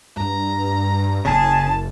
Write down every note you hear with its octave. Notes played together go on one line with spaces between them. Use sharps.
G2 A#5
F#1 C#3 G#4 A5